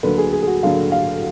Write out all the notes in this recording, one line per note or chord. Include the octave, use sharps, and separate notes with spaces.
D2 D3 F#3 A#3 D4 B4
G#4
G#4
G#4
F#4
D2 D3 F#3 A#3 D4 F5
F5